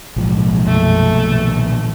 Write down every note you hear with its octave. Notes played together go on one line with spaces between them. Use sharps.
B1 A2 C3 F3 G#3
F#2 A3
A#2 D#3 E3 G3